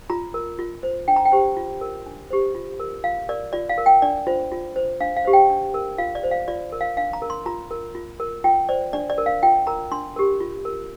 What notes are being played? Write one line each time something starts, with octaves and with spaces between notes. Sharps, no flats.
F4 A#5
A#4
F4
C5
D4 G5
A#5
G5
G4 C5
F4
A#4
D4
G4 C5
F4
A#4
F4 F5
A#4 D5
F4 D5
F5
A#4
G5
D4 D5
F4 C5
F4
C5
D4 F5
F5
G4 C5
G5
D4
A#4
F4 F5
D5
C5
F5
F4 D5
A#4
F5
D4 F5
A#5
A#4
C6
F4 A#5
A#4
F4
A#4
F4 G5
C5 D5
D4 D5
D5
A#4
F5
F4 G5
A#4 A#5
D4 C6
G4 A#4
F4
A#4